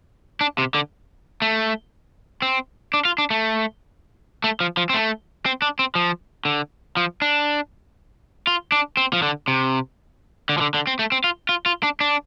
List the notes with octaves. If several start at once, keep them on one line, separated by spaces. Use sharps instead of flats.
D4
C3
D3
A3
C4
D4
F4
D4
A3
A3
F3
F3
C4
A3
C4
D4
C4
F3
D3
F3
D4
F4
D4
C4
F3
D3
C3
D3
F3
D3
D3
C4
A3
C4
F4
F4
F4
D4
D4